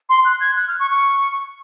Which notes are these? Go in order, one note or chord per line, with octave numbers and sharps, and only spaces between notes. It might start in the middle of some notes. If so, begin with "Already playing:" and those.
C6
F#6
G#6
F#6
F6
C#6
C#6